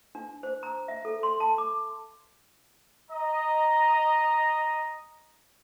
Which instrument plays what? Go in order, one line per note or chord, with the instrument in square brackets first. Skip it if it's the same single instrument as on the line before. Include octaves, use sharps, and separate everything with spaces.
[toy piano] D4
C5
A#5
E5
A4
C6
A5
D6
[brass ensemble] D#5 A#5